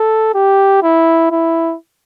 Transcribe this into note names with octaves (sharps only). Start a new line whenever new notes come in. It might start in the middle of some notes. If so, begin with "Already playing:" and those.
Already playing: A4
G4
E4
E4